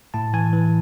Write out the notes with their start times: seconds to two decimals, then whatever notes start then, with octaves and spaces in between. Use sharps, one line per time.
0.14 A2 A5
0.34 E3 G#5
0.53 E3